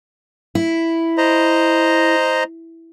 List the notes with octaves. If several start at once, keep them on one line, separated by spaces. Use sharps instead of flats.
E4
C5 D#5 A#5